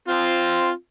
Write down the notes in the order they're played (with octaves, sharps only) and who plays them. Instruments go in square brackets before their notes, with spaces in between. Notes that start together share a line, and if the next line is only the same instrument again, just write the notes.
[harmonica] C4 F4